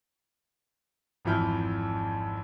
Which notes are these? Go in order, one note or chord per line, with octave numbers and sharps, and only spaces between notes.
G#1 F2 E3 E4 F6 G6